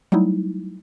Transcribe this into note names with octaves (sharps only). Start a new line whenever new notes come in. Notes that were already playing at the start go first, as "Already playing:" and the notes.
F#3 G3 A3 D#4 E4